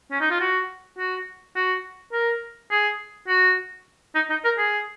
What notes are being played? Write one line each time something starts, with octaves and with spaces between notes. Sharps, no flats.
C#4
D#4
F4
F#4
F#4
F#4
A#4
G#4
F#4
D#4
D#4
A#4
G#4